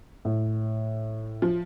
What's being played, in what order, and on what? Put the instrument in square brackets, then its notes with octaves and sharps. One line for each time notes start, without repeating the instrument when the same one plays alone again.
[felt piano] A2
[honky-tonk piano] F3